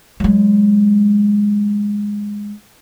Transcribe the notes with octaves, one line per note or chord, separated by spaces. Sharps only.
F#3 G#3